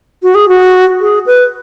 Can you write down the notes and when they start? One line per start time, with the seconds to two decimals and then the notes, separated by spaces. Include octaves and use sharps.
0.23 F#4
0.35 G#4
0.48 F#4
1.01 G#4
1.26 B4